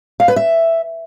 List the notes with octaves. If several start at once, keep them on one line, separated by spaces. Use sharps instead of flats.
F5
B4
E5